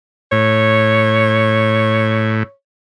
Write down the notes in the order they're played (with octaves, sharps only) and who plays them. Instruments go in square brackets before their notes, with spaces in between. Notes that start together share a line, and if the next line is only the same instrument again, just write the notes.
[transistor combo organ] A2 [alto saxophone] C#5